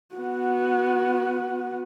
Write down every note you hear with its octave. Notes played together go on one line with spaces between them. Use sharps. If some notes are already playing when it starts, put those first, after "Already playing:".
B3 F#4